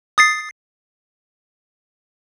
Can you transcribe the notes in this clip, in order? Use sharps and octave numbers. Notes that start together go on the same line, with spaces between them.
D#6 A6 C7